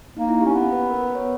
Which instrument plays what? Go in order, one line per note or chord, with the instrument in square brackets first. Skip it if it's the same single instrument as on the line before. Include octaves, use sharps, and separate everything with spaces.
[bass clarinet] A#3 [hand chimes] D#4
[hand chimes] E4
[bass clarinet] C#4 [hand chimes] G4
[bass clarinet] B3
[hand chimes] B4
A#4
B4
C#5